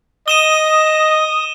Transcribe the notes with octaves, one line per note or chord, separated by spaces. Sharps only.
D#5 D#6 D#7 E7 G7